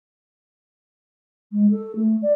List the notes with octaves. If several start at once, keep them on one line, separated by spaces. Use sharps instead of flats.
G#3
A4
A3
D5